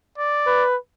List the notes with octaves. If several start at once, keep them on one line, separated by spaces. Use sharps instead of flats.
D5
B4